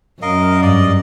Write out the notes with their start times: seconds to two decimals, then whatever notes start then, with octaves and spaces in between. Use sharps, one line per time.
0.22 F#2 A#4 D#5 F5
0.62 G2 D5 D#5